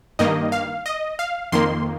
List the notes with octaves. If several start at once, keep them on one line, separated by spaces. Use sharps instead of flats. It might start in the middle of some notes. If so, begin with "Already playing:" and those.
G2 D#3 A#3 D#5
F5
D#5
F5
F2 D#3 A#3 C6